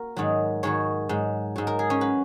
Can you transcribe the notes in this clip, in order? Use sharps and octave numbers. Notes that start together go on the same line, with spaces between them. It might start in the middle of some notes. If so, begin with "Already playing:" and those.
Already playing: A#3 F#4 A#4
G#2 D#3 F#3
G#2 D#3 F#3 C#5
G#2 F#3
G#2 F#3
A#4
G#4
C#4
F#3 B4